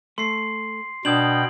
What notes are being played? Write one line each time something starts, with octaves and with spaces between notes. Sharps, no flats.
A3 C6 C7
B2 D4 G5 D#6 G#6 F#7